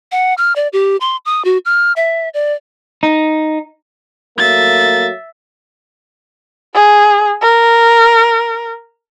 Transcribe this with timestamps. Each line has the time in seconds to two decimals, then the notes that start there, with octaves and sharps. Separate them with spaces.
0.12 F#5
0.38 F6
0.56 D5
0.73 G4
1.01 C6
1.25 D#6
1.45 F#4
1.65 F6
1.96 E5
2.34 D5
3.03 D#4
4.38 F#3 A3 A#3 E5 A6
6.74 G#4
7.42 A#4